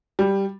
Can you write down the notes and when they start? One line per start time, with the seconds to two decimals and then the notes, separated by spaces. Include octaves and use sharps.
0.19 G3